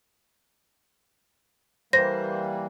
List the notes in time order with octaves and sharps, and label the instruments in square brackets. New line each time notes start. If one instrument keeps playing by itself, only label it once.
[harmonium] E3 G3 A#3 [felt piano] C5 [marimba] A#6